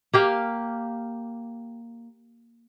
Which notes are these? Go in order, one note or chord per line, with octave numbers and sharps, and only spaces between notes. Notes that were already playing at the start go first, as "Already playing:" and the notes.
A#3 G4 F5